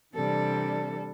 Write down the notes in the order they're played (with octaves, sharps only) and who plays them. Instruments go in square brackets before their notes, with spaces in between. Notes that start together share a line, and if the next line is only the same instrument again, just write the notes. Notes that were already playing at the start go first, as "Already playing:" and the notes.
[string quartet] C3 E3 G3 D4 A4